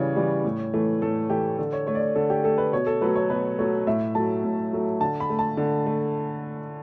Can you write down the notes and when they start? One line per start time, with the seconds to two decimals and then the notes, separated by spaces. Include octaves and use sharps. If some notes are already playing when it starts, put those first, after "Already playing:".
Already playing: C#3 E3 G3 C#5 D5
0.16 E3 G3
0.45 A2
0.74 E3 A3
1.02 A2 A4
1.30 E3 A3 G4
1.58 D3 A4
1.73 C#5
1.87 A3 C#5
1.95 D5
2.01 C#5
2.16 D3 A4
2.30 G4
2.44 A3 A4
2.58 B4
2.73 B2 C#5
2.87 A4
3.01 F#3 A3 B4
3.15 C#5
3.30 B2 B4
3.59 F#3 A3 C#5
3.87 A2 E5
4.15 F#3 A3 A5
4.44 A2
4.73 F#3 A3
5.00 D3 A5
5.20 B5
5.30 A3
5.39 A5
5.57 D3
5.86 A3